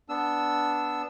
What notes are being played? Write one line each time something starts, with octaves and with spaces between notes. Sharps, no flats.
B3 D4 E6